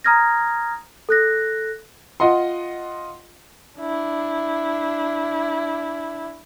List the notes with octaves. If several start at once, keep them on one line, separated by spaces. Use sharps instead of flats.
A#5 D#6 F6 G#6 A#6
A4 F#6 A#6
F4 D#5 F#5 C6
D4 E4